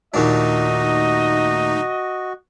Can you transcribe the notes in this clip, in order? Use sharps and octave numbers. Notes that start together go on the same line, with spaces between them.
D#2 A#2 A3 D4 D#4 F#4 D#5